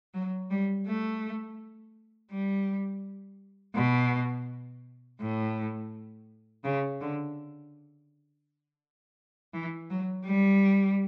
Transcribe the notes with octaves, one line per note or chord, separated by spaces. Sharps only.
F#3
G3
A3
G3
B2
A2
C#3
D3
E3
F#3
G3